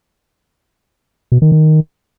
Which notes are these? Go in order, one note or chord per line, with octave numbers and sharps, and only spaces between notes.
B2
D#3
D#3